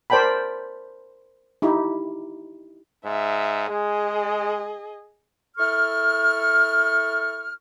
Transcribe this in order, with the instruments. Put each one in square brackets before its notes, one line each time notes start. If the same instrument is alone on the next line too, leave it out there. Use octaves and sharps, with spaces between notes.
[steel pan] A#4 C5 D5 G5 A5 B5
D#4 E4 G4
[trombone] G#2 [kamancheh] E5
[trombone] G#3 [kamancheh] G#4 D#5
[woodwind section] E4 A4 C#6 F6